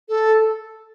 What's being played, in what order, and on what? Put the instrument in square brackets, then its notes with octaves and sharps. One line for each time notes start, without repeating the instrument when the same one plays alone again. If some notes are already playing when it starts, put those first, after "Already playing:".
[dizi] A4